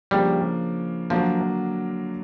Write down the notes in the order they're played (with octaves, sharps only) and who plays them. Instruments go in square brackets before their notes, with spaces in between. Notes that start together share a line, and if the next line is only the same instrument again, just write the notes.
[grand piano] C#3 F3 A#3 D4 [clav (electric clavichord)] G3
[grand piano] D3 F#3 A#3 D4 [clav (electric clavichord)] F3